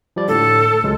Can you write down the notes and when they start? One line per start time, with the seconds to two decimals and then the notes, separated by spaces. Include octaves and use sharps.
0.16 F3 G3 D5
0.28 A2 D3 A4
0.84 C#2 F#3 G#3